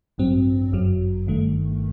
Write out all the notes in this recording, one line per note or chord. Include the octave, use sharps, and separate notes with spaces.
A1 G2 F#3 C4
G1 F#2 F#3
G1 G2 D#3 A3